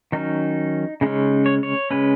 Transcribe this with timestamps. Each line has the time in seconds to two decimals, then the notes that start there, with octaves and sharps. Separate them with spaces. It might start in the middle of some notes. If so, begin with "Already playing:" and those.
0.12 D#3 F#3 C#4 D#4
1.01 C#3 G#3 C#4 D#4
1.46 C#5
1.63 C#5
1.91 C#3 G#3 C#4 B4